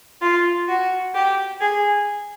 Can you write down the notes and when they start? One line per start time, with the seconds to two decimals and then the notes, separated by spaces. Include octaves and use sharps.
0.21 F4
0.68 F#4
1.14 G4
1.60 G#4